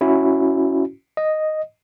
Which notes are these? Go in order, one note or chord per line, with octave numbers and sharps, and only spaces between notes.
C#4 E4 F#4
D#5